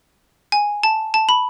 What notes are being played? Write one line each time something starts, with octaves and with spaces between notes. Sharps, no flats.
G#5
A5
A5
B5